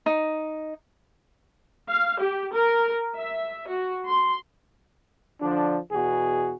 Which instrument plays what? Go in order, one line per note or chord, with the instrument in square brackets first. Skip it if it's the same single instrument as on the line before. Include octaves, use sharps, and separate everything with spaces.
[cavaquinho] D#4
[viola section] F5
G4
A#4
E5
F#4
C6
[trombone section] D3 F3 D4
E2 B2 F#4 G#4